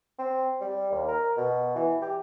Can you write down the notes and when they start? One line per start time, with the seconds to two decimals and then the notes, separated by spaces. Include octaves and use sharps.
0.19 C4
0.61 G3
0.91 D#2
1.08 A#4
1.37 B2
1.75 E3
2.02 G4